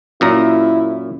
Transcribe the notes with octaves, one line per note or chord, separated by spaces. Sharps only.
F#2 A#2 E4 A#5